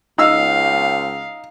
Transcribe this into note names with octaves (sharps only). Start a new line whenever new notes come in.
C#2 D#4 F5 E6